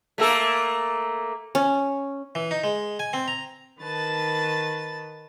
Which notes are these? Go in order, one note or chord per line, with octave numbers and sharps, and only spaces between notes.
A3 A#3 A4
C#4
E3
D#4
G#3
G#5
C4
A#5
D#3 B4 A5 A6